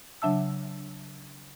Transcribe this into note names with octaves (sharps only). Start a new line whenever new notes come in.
C#3 F#3 D4 E5 A5 E6